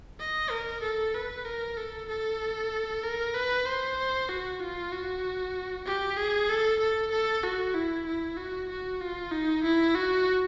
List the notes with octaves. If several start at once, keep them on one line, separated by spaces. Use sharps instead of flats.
D#5
A#4
A4
B4
A#4
A4
A4
A#4
B4
C5
F#4
F4
F#4
G4
G#4
A4
A4
A4
F#4
E4
E4
F#4
F#4
F4
D#4
E4
F#4